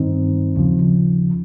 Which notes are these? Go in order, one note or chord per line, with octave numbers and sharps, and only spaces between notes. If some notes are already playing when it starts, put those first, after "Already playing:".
Already playing: G2 D#3 C4 D#4
D#2 C#3 F3